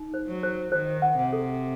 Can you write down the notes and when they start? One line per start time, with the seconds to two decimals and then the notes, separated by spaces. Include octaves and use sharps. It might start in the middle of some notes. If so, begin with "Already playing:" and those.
Already playing: D#4
0.14 C5
0.27 F#3
0.43 C5
0.72 D#3 C5
1.02 F#5
1.17 C3
1.33 A4